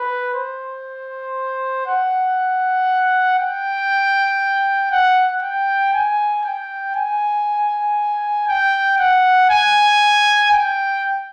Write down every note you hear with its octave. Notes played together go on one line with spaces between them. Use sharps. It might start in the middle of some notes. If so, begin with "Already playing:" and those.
Already playing: B4
C5
F#5
G5
F#5
G5
G#5
G5
G#5
G5
F#5
G#5
G5